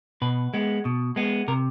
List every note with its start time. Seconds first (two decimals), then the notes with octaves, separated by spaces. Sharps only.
0.22 B2 B4
0.54 G#3 B3
0.85 B2
1.16 G#3 B3
1.48 C3 A#4